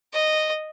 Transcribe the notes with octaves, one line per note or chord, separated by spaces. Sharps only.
D#5